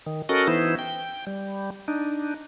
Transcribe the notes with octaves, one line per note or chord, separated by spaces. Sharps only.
D#3
C#4 F#4 A4 A#4 D#5
E3 B3 D#4 E4 C5
G5
G3
D4 D#4